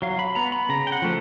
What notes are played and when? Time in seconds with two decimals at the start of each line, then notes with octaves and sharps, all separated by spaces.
0.02 F#3 F5
0.19 B5
0.35 B3 A#5
0.52 B5
0.69 C#3 A#5
0.87 G5
0.92 F#5
1.02 F3 A3